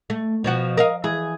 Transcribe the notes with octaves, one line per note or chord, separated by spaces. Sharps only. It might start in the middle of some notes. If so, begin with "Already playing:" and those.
A3
B2 F3 F#4
A#4 D#5 F5
E3 G#4